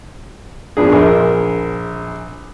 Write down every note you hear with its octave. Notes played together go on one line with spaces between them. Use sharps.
A#2 F3 B3 D4 G#4
A#1 G#4 A#4